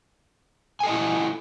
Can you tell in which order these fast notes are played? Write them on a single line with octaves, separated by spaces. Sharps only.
G#5 A4 D#5 E4